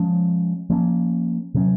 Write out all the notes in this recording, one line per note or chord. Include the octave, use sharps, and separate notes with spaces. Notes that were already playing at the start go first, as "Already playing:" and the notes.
Already playing: F3 G#3 C#4
F3 A#3 C#4
C3 F#3 C#4